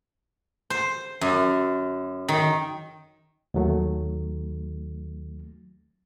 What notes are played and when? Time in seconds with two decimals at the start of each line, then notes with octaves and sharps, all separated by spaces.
0.70 C5
1.21 F#2
2.28 D#3
3.54 D#2 D#3 F#3 A3